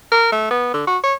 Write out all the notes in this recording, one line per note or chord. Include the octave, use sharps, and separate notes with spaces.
A#4
A3
B3
D3
F#4
C#5